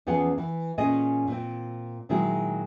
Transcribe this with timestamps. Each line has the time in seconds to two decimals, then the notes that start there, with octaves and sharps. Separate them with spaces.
0.07 E2 F3 B3 C#4 G#4 F#5
0.38 E3
0.78 A#2 C#4 G#4 D#5
1.27 A#2 C4
2.09 A#2 D#3 F#3 G#3 E4 G#4